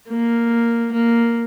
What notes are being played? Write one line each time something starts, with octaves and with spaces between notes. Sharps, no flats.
A#3
A#3